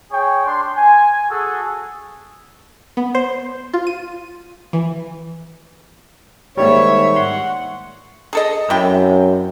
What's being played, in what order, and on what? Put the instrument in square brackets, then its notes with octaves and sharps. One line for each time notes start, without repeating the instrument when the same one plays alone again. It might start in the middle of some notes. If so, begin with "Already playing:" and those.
[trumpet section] G#4 C#5 G5
D4 C6
G#5
F#4 G#4 A4
[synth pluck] B3
C5
F4
D#7
E3
[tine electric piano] G#2 D#3 G3 [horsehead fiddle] A#3 E5 [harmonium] C#5
[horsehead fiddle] F#5 [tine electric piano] C6
[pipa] G#4 A4 D#5
[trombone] F#2 [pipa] C3 E4 G5